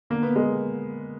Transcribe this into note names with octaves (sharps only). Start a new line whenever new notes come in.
D3 A#3
B3
G#3 A#3